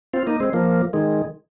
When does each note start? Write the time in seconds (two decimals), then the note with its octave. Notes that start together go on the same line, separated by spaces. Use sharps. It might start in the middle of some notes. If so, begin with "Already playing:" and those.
0.13 C4 F4
0.27 A#3 D#4
0.40 G#3 C4
0.53 F3 A#3
0.93 D#3 G#3